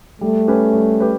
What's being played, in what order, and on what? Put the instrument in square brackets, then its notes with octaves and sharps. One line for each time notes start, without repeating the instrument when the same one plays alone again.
[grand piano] G3 [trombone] A3
[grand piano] C#4 G4 B4
G3
G4 B4